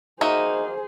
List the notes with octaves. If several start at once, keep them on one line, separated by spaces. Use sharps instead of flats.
A#3 D#4 F#4 G#4 C5 E5